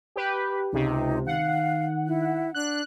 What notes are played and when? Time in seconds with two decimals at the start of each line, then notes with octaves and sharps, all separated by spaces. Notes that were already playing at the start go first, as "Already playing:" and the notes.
0.16 G4 B4
0.73 C#2 C3 D#4
1.27 D#3 F5 F#5
2.07 E4
2.55 D4 F#6